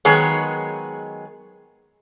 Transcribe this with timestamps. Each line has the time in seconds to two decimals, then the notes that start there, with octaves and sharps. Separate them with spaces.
0.05 D#3 F#3 G#3 B3 G#4 C#5